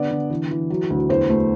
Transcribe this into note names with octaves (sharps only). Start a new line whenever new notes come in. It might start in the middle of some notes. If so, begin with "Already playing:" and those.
Already playing: D3 B3 D5
D3
E3
E3
F#3
D2
E2 C5
A3